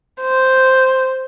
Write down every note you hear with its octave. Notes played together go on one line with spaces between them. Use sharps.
C5